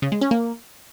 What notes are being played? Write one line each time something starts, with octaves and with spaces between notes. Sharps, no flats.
C#3
G#3
C#4
A#3